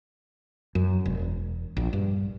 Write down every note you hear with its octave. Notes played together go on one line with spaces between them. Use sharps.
F#2
E1
A#1
G2